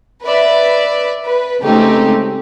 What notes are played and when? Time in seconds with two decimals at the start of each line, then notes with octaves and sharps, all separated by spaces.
0.24 B4 D5 E5
1.25 B4
1.61 C#3 G#3 A3 C4 D#4 G4